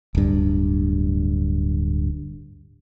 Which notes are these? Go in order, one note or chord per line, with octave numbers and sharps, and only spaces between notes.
D1 G2